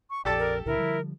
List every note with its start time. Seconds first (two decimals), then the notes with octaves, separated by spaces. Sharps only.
0.10 C#6
0.25 A#1 F2 G4 A4 D5 A5
0.39 A#4
0.66 C#2 A#2 D3 E4 A#4
0.78 D3 F3 G3